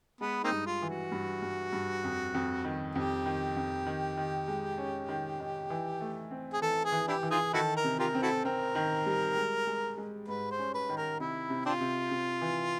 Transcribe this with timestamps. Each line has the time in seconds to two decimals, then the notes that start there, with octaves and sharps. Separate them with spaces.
0.20 G#3 B3
0.44 A#3 C4 D#4
0.51 G2
0.66 F4
0.82 E3
0.89 F#4
1.12 G2
1.42 G2
1.73 G2
2.04 F2
2.34 F2
2.65 D#3
2.95 F2 G4
3.26 D#3
3.56 F2
3.86 D#3
4.17 D#3
4.48 G#3
4.78 C#4
5.09 D#3
5.40 D#3
5.70 E3
6.01 A3
6.31 C4
6.53 G#4
6.62 E3 A4
6.85 G#4
6.92 E3
7.08 D4 E4 G4
7.23 E3
7.31 D#4 F4 G#4
7.53 D#3 E4 F#4 A4
7.76 A#4
7.84 C3
7.99 F4 G4 A#4
8.15 C4
8.22 E4 F#4 A4
8.45 C4 A#4
8.75 D#3
9.06 G3
9.36 G#3
9.67 G#3
9.98 G#3
10.28 G#2 B4
10.51 C5
10.59 C#4
10.74 B4
10.89 D#3
10.97 A#4
11.20 C3 E4
11.50 C3
11.66 C4 D4 F4
11.81 C3
12.11 C3
12.41 E3